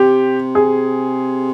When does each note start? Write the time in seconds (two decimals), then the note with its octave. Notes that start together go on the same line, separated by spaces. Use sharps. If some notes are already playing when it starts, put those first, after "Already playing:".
Already playing: C3 G4
0.55 G#4